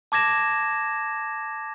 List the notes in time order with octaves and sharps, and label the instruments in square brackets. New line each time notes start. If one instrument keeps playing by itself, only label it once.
[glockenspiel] A5 D6 G#6 A#6 E7